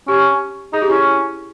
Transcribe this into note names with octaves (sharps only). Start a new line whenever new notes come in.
C#4 G4
D#4 G#4
G4
C#4 E4